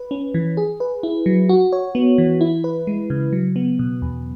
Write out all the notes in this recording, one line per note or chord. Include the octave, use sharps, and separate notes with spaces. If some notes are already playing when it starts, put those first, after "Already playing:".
Already playing: B4
C#4
E3
G#4
B4
E4
F#3
F#4
C#5
B3
E3
E4
B4
G#3
C#3
F#3
B3
B2
E2